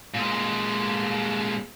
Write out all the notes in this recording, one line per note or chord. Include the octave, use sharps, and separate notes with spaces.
A#2 G#3